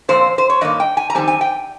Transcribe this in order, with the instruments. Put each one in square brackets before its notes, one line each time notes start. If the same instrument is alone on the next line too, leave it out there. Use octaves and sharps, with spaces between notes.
[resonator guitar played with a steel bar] A#2 F3 C4 C5
C5
C#5
G2 D#3 A#3 D#5
G5
G#5
A#5
F2 D#3 G3 C4 G#5
G#5
G5